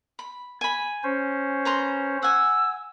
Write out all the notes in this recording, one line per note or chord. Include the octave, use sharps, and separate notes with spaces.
B5
G#5 B5
C#4 C5
B4 A#5 C6
F#5 G#5 E6